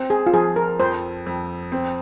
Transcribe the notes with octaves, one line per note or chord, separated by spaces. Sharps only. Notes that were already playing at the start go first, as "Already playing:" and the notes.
Already playing: C4
G#4
F4
F3 G#4
A#4
F2 C5
F2
C4